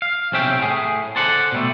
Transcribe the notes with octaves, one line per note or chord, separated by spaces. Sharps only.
F5
B1 C3 C4 C#4 E5 G5
A2 G#4
A4 C5 D5 F#5
B2 G3 A3